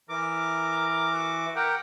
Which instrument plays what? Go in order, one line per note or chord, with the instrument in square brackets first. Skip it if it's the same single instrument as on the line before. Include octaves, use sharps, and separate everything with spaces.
[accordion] E3 D6 [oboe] A#4
[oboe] F#4
[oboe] G4 [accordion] A#4 F#5 G5